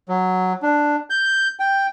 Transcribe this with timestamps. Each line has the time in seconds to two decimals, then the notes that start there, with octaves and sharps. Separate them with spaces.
0.09 F#3
0.63 D4
1.10 G6
1.60 G5